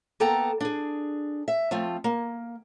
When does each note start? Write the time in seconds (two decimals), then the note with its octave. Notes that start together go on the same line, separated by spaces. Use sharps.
0.20 A#3 B3 A4 G5 A5 A#5
0.60 D4 G#4
1.48 E5
1.71 F3 A3 C4 F4
2.04 A#3